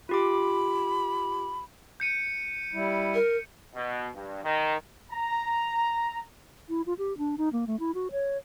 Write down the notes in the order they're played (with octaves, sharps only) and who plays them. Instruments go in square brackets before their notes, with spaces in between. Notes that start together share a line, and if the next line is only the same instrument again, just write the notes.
[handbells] F4 G4 D6 [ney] B5
[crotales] G6 C#7 D#7
[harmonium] G3 E4
[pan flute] A#4
[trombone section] B2
G2
D#3
[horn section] A#5
[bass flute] E4
F4
G4
D4
D#4
A#3
A3
E4
F#4
C#5